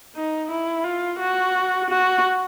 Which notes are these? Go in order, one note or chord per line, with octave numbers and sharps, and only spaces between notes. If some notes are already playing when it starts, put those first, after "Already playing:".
D#4
E4
F4
F#4
F#4